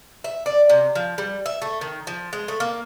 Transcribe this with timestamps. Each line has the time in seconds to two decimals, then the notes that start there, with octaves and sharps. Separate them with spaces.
0.24 E5
0.46 D5
0.69 C3
0.95 F3
1.18 G3
1.46 E5
1.62 A3
1.81 D#3
2.07 F3
2.33 G#3
2.48 A3
2.60 A#3